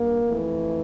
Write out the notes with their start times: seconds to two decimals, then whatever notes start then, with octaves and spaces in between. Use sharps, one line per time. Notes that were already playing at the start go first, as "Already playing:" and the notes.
Already playing: G2 A#3
0.24 F2 E3 A3